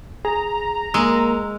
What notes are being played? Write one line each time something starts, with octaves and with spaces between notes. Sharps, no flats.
G#4 A#5
G#3 A#3 E6